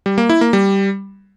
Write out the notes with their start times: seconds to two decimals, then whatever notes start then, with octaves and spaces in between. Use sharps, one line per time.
0.06 G3
0.18 A#3
0.29 E4
0.41 A#3
0.53 G3